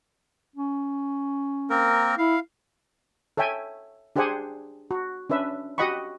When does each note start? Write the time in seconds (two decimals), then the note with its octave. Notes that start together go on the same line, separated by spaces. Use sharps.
0.56 C#4
1.70 A#3 C4 A#4
2.18 E4 F5
3.37 A4 C#5 E5 G5 G#5
4.16 D4 G4 G#4 C5 F#5 G#5
4.91 F#4
5.30 C#4 D4 B4 E5
5.78 F#4 G4 D#5 F#5 B5 C#6